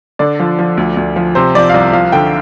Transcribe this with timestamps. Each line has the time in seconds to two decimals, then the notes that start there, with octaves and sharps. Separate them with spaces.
0.19 D3 D5
0.40 F3
0.59 F3
0.77 D2
0.97 D2
1.16 F3
1.35 C3 C5
1.55 F3 D5
1.70 F5
1.74 C2 D5
1.93 F3 F5
2.12 D3 G5